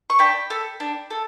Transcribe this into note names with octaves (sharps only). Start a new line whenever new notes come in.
C#6
D4 G5 B5
A4
D4
A4